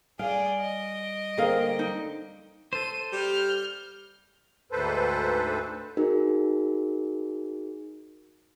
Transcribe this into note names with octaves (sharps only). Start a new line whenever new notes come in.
G3 G#4 D5 F5
D#5
D3 A#3 C4 G#4 A#4 F5
D#4
A4 C5 D#7
G3 F6 G6
D2 G#2 A4 B4 C5
D#4 F#4 G#4 A#4